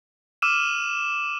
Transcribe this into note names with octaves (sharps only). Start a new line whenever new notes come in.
D6 E6 F6 D#7 E7